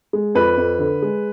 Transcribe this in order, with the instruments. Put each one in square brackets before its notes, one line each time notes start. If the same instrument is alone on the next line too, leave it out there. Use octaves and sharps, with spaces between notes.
[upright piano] G#3
F2 B4
F2
D3
G#3